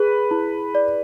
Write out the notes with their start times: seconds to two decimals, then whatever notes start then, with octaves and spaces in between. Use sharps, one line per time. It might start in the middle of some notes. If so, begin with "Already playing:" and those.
Already playing: G#4 B4
0.31 E4
0.75 D5